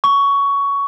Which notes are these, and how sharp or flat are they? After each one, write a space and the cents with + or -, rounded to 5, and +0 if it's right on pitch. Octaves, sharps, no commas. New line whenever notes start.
C#6 +15